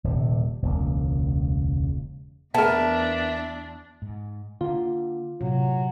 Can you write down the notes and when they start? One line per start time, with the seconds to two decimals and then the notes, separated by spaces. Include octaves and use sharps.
0.04 D#1 C3
0.62 E1 C#2 A#3
2.54 E2 B3 D4 A#4 E5 A5
4.02 G#2
4.61 D3 A#3 F4
5.41 A2 C3 F#3